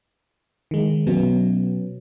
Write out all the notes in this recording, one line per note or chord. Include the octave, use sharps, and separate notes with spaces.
D#3 G#3
B2 F#3 B3 C#4